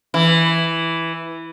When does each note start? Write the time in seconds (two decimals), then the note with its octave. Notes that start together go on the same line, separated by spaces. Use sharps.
0.14 E3